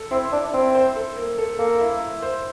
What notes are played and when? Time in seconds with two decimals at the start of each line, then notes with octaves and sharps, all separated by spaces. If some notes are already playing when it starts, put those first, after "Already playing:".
Already playing: A4
0.11 C4 E4
0.32 D4 E4
0.54 C4 E4
0.75 C5
0.96 A4
1.17 A#3
1.38 A4
1.59 A#3 A4
1.81 E4
2.02 E4
2.22 C5